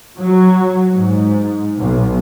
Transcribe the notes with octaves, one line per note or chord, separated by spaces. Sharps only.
F#3
G#2
B1